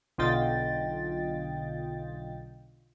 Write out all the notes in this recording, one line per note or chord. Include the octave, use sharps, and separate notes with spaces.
B1 D3 F4 D#5 G5 A6